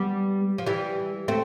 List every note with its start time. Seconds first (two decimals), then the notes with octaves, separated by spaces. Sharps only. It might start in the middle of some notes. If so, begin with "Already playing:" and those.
Already playing: G3 B3
0.58 F3
0.66 E3 G3
1.28 A3 C4